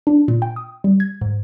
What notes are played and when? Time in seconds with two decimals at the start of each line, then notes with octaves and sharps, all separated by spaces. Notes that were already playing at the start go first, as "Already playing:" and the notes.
0.07 D4
0.28 A#2
0.42 G5
0.56 D#6
0.84 G3
1.00 G#6
1.21 G#2